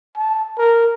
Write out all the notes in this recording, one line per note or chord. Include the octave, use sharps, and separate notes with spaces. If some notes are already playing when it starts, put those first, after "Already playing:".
A5
A#4